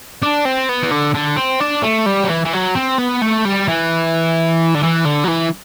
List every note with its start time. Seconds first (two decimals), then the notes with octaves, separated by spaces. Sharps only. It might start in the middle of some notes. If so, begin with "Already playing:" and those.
0.22 D4
0.45 C4
0.69 B3
0.83 E3
0.91 D3
1.14 D3
1.37 C4
1.60 D4
1.83 A3
2.06 G3
2.23 F#3
2.29 E3
2.45 E3
2.53 F#3
2.75 C4
2.98 B3
3.21 A3
3.45 G3
3.68 E3
4.75 D3
4.83 E3
5.05 D3
5.24 F#3
5.28 E3